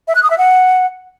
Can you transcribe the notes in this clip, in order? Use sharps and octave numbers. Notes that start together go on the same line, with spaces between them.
E5
F#6
D#6
E5
F#5